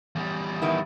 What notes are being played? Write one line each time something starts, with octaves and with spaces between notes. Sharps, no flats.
E2 G3
D#3 B3 E4